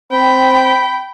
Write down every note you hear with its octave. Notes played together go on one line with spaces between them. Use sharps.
C4 G5 B5